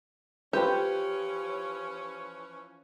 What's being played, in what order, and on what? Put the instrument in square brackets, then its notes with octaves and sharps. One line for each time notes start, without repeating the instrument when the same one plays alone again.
[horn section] E3 F3 C#4 [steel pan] F4 B4 C5 [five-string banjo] G4